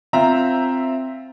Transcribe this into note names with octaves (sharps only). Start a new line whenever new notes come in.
C4 F4 C5 E5 A#5